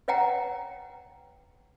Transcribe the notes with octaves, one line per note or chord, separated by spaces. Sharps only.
B4 C#5 F#5 G5 A#5